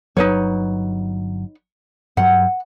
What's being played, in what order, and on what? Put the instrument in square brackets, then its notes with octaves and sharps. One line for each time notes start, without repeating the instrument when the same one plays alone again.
[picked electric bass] G1 F#3 [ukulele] D#4 B4 C#5
[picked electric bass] G2 F#3 [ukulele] F#5